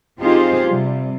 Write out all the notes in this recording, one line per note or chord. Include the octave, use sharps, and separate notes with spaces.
C4 D#4 F4 G4 G#4 C5
C3 G3